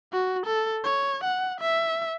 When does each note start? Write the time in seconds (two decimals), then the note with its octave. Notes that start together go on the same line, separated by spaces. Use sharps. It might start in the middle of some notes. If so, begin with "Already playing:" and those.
0.13 F#4
0.46 A4
0.83 C#5
1.24 F#5
1.61 E5